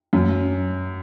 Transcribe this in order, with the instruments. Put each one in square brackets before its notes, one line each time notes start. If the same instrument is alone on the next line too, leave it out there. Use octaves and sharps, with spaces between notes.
[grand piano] F#2